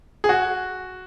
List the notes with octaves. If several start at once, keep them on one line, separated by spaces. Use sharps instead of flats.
G#4
F#4